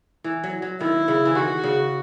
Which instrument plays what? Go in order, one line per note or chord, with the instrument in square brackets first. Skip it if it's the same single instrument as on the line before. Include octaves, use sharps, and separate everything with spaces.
[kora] E3
F#3
F#3
[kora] D#3 [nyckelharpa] E4
[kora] C#3
E3
[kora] D#3 [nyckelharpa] F#4
[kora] C#3